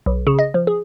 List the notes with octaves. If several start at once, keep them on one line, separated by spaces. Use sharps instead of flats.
B1
C#3
D#5
F3
G#4